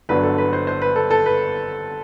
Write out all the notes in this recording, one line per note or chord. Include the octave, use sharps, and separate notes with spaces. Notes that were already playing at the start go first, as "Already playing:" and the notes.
G1 G2 D3 F#3 B4
A4
B4
C5
C5
B4
A4
A4
B4